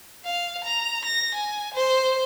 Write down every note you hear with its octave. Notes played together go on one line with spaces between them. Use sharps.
F5
A#5
A#6
G#5
C5